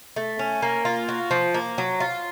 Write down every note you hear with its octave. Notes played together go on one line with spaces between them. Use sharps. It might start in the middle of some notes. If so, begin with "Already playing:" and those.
A3
C#4
A#3
F4
F#4
F3
A#3
F#3
F4